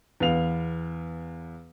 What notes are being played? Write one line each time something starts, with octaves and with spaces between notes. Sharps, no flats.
E2 B3 F5 F7